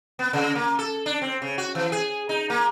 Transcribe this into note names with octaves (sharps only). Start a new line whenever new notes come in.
B3
C#3
A#3
A4
D4
C4
C#3
F#4
E3
G#4
D#4
A#3